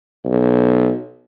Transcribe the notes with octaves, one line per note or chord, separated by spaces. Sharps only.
B1